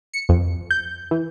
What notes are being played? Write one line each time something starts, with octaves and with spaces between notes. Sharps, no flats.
C#7
F2
G6
E3